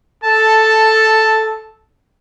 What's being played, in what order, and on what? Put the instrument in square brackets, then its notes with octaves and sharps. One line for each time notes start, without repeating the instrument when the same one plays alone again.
[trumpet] A4 [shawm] A5